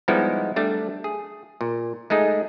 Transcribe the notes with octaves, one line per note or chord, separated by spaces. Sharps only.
F3 G3 G#3 B3 D#4 E4
G3 A3 D4
G#4
A#2
G#3 A3 D#4 G#4